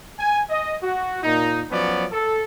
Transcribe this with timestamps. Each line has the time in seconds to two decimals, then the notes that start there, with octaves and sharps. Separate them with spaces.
0.19 G#5
0.50 D#5
0.83 F#4
1.23 A#2 D#4
1.71 F3 F#3 B3 C#4 D5
2.13 A4